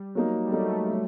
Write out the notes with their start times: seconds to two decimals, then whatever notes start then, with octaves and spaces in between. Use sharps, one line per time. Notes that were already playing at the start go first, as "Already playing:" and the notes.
Already playing: G3
0.15 F#3 A#3 D#4
0.45 G3
0.52 F#3 A3 A#3 D#4
0.90 F#3